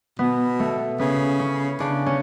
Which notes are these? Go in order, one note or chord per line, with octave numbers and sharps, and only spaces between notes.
B2 B3
A3
C#3 B3
C#4
C#3 D4
C#4